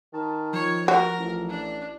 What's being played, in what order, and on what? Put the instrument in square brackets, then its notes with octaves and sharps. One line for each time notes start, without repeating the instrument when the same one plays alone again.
[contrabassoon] D#3 [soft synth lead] A5
[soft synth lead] F3 [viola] C#5
[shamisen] F#4 [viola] A#4
[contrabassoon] A1
[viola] D4